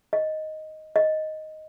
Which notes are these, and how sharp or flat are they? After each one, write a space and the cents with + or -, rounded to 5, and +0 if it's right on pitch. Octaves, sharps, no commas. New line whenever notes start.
D#5 +5
D#5 +5